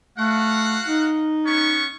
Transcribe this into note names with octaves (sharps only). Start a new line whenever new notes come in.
A3 F#4 F5 F#5
D#4
B3 C#4 C#6